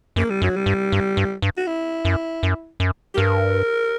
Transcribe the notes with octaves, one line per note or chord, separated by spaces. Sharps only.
F#2 A#3
G3
F#2 F#3
G3
G2
G2
G2
G2
F#4
E4
F#2
F#2
F#2
G4
G2 A#4